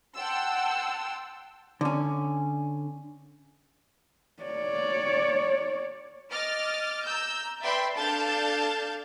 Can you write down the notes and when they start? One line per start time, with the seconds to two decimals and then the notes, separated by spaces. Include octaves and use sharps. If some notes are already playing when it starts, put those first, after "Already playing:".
0.16 F#5 G5 A5 C6 E6
1.81 D3 C#4
4.43 C#5 D5
6.30 D#5 D6 F6 A6
7.05 A#5 E6 G6
7.61 B4 D5 E5 G5 B5 C6
7.96 D4 A4 F5 A5 G6 A6